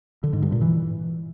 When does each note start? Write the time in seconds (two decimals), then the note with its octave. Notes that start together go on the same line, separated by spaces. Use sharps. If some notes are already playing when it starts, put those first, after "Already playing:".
0.24 D3
0.33 G#2
0.43 G2
0.52 A#2
0.62 E3